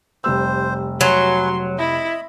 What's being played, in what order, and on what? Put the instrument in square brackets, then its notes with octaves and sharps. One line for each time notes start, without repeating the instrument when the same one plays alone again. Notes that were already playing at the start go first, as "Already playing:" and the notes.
[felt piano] F1 G3 E6 [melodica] C5
[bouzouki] F#3 [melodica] F#4 B4 G#5 [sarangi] C6
[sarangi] E4 [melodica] D#5 B5